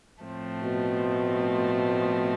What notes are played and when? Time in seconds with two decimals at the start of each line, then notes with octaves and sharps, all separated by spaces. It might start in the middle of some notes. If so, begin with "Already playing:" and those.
0.24 A2 F3 A3 C4
0.63 B2